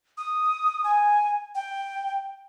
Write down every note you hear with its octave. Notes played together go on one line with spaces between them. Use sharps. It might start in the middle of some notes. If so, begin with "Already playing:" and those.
D#6
G#5
G5